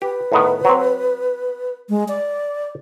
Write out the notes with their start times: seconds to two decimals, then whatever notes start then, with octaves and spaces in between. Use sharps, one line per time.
0.02 G4 B4
0.32 A2 D#3 B3
0.65 F#3 C4
1.89 G#3
2.08 D5